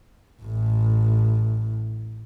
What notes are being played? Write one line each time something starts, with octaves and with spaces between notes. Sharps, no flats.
A1 A2